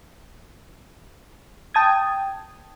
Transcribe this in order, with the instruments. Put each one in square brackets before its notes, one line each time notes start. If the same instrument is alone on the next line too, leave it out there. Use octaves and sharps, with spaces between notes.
[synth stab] G5 A5 D#6 G#6